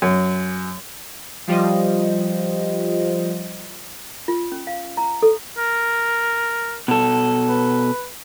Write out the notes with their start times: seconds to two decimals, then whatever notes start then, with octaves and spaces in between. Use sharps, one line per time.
0.02 F#2
1.48 F3 G3 F4 C5 D#5
4.28 F4
4.52 C#4
4.67 F5
4.97 A#5
5.22 A4
5.58 A#4
6.88 B2 A4
7.48 B4